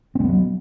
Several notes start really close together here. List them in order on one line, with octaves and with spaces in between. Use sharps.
C4 G#3 B3 F#3